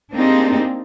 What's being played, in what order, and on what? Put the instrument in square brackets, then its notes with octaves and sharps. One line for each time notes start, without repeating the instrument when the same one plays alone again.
[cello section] A#3 C4 D4 D#4 G4 G#4